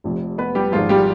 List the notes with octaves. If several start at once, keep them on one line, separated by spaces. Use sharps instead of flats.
F1 F2 C3
B3 B4
G3 G4
G#1 G#2 F3 G#3 F4
G3 G4